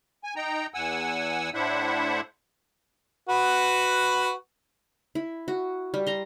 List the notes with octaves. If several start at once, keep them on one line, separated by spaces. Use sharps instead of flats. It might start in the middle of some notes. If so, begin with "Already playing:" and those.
G#5
D#4 G5 A#5
E2 F#5 G#5 E6
A2 D4 E4 C5 E5 F#5
F#4 B4 F#5
E4
F#4
G3
A#5 C6